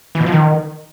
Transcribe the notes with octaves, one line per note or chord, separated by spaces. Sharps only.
E3
B2
F3
D#3